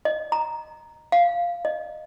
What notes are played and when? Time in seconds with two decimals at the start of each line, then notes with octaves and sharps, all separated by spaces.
0.05 D#5
0.32 A#5
1.12 F5
1.65 D#5